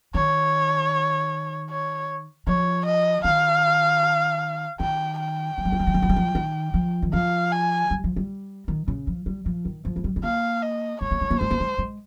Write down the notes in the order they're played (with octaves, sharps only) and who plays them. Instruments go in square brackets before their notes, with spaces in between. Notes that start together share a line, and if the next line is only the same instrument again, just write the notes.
[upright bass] D#3 [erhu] C#5
[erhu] C#5
[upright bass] F3 [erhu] C#5
[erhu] D#5
[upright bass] D#3 [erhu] F5
[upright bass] D#3 [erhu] G5
[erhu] G5
[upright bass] F3
G3
F3
G3
F3
G3
F3
G3
F3
D#3
F3
D#3
[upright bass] F3 [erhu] F5
[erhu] G#5
[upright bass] G3
F3
G3
D#3
C#3
F3
G3
F3
D#3
F3
G#3
G3
G#3
[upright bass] A#3 [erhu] F5
[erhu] D#5
[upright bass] G#3 [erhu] C#5
[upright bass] A#3
G#3
A#3
[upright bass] G#3 [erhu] C5
[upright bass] A#3
G#3
G#3